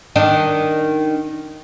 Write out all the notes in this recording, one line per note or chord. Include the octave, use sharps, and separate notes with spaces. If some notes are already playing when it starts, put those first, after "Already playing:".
D#3 D4